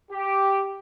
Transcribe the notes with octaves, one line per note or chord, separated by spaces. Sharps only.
G4